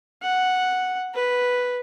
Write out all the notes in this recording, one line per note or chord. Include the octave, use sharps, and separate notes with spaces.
F#5
B4